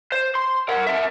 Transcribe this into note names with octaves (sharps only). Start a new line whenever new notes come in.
C5
C6
A#4 F#5
A#4 E5